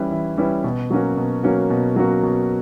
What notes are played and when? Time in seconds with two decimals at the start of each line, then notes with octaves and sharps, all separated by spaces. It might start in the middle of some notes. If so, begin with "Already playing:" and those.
Already playing: E3 G3 C#4 E4 B4
0.11 E3
0.38 G3 C#4 E4 B4
0.64 B2
0.90 F#3 A#3 C#4 F#4
1.17 B2
1.43 F#3 A#3 C#4 F#4
1.70 B2
1.96 F#3 A#3 C#4 F#4
2.23 B2